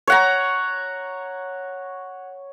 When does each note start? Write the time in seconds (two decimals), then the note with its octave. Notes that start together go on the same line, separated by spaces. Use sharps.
0.07 C#5 F#5 A#5